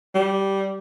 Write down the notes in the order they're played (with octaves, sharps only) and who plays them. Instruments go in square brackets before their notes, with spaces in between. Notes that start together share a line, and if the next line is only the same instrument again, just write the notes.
[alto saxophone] G3